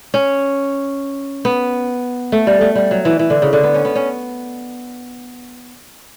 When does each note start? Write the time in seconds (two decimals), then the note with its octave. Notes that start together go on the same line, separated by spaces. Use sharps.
0.14 C#4
1.45 B3
2.32 A3
2.47 G3
2.61 A3
2.75 G3
2.91 F#3
3.05 E3
3.19 E3
3.30 D3
3.42 C#3
3.53 D3
3.63 B3
3.74 C#4
3.85 B3
3.96 C#4